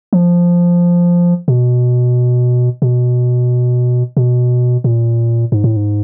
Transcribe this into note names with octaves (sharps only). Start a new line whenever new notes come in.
F3
B2
B2
B2
A#2
G#2
A2
G#2